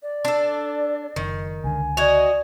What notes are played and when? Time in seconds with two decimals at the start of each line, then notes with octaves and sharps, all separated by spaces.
0.03 D5
0.25 D4 A4
1.16 F#1 D#3
1.64 C#2 D3 G#5
1.97 F#4 D5 D#5 G#6 F7